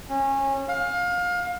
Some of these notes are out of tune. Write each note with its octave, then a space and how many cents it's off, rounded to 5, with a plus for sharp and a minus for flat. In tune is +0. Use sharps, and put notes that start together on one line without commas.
C#4 -25
F5 +25